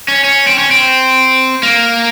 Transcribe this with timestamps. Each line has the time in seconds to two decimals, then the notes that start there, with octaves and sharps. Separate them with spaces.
0.08 C#4
0.24 C#4
0.47 C4
0.58 C#4
0.71 C4
1.63 A#3